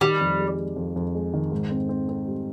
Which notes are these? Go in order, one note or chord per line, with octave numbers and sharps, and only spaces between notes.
D#3 G3
F2
G#3
G#3
F2
F2
G#3
D#3
G#2
C4
C4
C4
G3